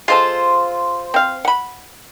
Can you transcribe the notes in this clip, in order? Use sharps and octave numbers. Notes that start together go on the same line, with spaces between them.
G#3 F4 A4 C5
C4 F5
F#5 B5